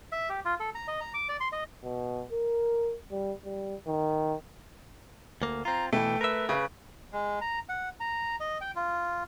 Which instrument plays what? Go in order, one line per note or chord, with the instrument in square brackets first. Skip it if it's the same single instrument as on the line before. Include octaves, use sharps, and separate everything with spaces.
[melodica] E5
G4
F4
A4
A#5
D#5
A#5
D6
D5
C6
D#5
[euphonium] B2
A#4
G3
G3
D#3
[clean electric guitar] D2 A#3
[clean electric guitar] C4 F4 [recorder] A#5
[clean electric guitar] B2 E3 [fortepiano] A3 [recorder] G5
[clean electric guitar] A#4 E5 [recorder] B4
[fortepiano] C#3 [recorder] B4
[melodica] G#3
A#5
F#5
A#5
D#5
G5
F4